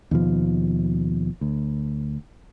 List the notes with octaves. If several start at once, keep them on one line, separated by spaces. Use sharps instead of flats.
D#2 B2 F3
D2